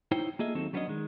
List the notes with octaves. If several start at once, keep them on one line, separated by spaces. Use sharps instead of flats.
D#4 E4 C5 C#5 G5
A#3 F4 G#4 A4 D#5 E5
D#2 F#3 C4 D#4 A4
F#3 G3 B3 C#4 D4 D#5
D#3 G#3